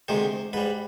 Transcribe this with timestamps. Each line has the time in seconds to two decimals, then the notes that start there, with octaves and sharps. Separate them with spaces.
0.08 D2 C3 D#3 G#3 C5
0.53 G#2 G3 B4